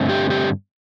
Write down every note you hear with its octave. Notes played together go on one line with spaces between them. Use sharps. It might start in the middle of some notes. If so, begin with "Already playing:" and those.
Already playing: G2 D3 A3 C4
G4
G4